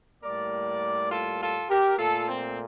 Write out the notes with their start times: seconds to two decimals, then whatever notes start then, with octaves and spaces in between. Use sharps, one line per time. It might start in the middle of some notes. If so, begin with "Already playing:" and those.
0.23 A2 G3 A#3 A#4 D5
1.10 F4 A4
1.40 F4 A4
1.69 G4 A#4
1.98 A#2 A3 F4 A4
2.28 C4